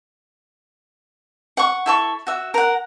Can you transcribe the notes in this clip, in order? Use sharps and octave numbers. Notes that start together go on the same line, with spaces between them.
F#5 C#6
E4 A4 C#6
F#4 E5
A#4 F#5